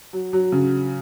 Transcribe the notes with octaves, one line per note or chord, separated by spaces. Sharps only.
F#3
F#3
C#3